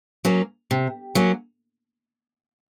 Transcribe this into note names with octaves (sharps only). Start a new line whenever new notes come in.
F#3 A#3 C#4
C3
F#3 A#3 C#4